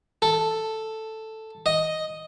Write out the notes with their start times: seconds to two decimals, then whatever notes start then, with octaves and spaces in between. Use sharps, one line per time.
0.22 A4
1.66 D#5